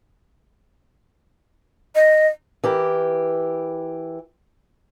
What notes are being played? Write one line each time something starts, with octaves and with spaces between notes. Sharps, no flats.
D#5
E3 G4 A#4